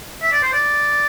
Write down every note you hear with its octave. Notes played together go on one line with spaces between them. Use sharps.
E5
D5
C5
D5